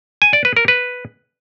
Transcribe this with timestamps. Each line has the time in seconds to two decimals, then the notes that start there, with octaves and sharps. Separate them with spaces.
0.22 G#5
0.33 D5
0.45 B4
0.57 A#4
0.68 B4